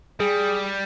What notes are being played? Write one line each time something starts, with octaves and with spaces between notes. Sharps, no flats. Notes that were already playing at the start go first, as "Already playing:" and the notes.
G3 G#4